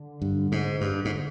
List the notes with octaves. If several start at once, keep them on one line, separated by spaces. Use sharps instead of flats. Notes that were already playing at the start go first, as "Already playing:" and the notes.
Already playing: D3
G2
G#2
G2
G#2